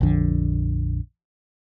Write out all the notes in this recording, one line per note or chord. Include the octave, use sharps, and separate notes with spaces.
A#1 F2 D3 F3